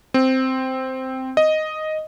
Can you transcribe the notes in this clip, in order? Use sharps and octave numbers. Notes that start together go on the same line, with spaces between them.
C4
D#5